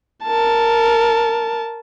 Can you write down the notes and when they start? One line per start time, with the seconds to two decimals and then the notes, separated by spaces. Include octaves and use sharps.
0.24 A#4 A5